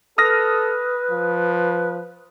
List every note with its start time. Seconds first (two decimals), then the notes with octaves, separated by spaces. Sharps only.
0.18 A4 B4 D#6 F6 A#6
1.11 F3